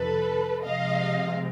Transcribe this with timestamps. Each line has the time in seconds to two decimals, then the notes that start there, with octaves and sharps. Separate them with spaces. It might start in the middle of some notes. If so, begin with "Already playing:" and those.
Already playing: F2 C3 D#3 A4 B4
0.63 C3 F3 G#3 C4 D#5 F5